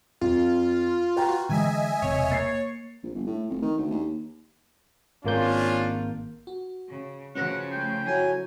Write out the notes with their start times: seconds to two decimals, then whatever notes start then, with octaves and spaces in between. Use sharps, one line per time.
0.21 F2 F4
1.16 F#4 B4 G5 A#5
1.49 D3 E3 G#3 D#5 E5 G#5
2.02 E1 C3 C#5
2.31 A#3 A6 C7
3.03 A#1
3.15 G1
3.27 A2
3.50 F1
3.62 D#3
3.78 D2
3.91 D#2
5.25 G#1 A#3 C#4 D4 F4 G6
6.47 F#4
6.89 C#3
7.35 C#3 F3 C#4 F#4 B4 F#5
7.72 A3 G5 C7
8.06 F#3 E4 A4 C#5 G#5